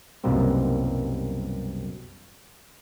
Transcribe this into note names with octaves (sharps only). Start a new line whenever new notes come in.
C2 F#2 B2 G3 A#3 C4